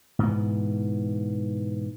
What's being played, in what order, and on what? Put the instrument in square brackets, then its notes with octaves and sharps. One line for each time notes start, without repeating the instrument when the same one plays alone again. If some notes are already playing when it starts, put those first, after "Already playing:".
[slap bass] G#2 B2 E3